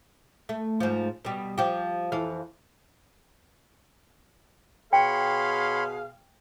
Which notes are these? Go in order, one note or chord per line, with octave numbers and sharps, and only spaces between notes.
A3
G#2 F3
B2 G3
F3 G4
F2 E3 F5
B2 G#4 C#5 F5 G5 B5 C6